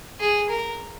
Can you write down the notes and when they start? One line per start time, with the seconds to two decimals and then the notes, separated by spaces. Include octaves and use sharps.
0.20 G#4
0.49 A#4